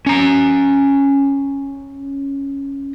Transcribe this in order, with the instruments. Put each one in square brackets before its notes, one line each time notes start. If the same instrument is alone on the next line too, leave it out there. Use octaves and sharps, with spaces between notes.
[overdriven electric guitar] C#4 A#5